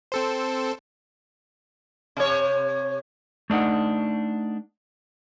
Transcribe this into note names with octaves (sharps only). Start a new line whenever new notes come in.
C4 A4 C5
C3 C#5
A3 D4 D#4 F#5